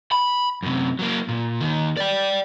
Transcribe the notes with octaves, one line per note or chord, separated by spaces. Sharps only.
B5
F#2 C3
F#3 A#3
A#2
D#2 D#3
D5 G5